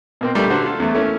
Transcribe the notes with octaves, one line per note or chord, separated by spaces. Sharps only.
B2 A#3 C4
A#2 G3 A3 D4
D3 F#4 C5
F4 A4
E2 A3
A3 A#3 C#4 E4